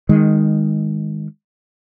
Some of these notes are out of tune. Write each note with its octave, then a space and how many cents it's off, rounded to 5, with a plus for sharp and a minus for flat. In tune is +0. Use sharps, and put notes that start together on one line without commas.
D#3 +0 G#3 -15